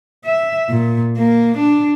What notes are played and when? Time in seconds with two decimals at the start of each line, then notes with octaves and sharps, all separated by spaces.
0.25 E5
0.70 A#2
1.18 A#3
1.58 D4